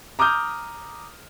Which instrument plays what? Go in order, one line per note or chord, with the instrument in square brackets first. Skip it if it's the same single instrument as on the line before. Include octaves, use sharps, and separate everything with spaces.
[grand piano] A#5 D6 D#6 F6 G6